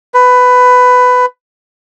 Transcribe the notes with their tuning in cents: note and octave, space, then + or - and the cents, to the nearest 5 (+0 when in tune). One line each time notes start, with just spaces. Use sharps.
B4 +15